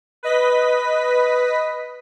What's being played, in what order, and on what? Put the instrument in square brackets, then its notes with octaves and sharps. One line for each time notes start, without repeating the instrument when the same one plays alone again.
[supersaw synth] B4 D#5 B6